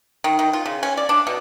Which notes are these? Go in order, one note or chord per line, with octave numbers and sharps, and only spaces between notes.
D#3
D#3
F4
C#3
C#4
D5
D4
B2